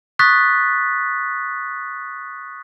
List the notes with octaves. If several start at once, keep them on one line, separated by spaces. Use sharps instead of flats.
C#6 D#6 F#6 A6 B6